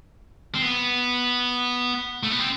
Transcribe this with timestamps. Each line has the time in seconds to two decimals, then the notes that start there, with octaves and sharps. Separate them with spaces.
0.55 C4
0.62 B3
2.23 A3
2.31 B3
2.39 C4